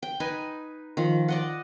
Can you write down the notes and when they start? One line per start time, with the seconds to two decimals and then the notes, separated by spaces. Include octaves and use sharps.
0.03 G5
0.20 D#4 B4 G#5 B5
0.97 D#3 F3
1.28 D5 D#5 F#5